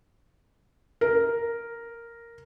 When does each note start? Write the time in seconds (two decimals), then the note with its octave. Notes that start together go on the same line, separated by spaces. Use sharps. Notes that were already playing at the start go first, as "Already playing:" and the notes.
1.01 A#4